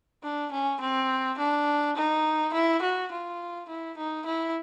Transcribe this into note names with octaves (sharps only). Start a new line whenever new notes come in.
D4
C#4
C4
D4
D#4
E4
F#4
F4
E4
D#4
E4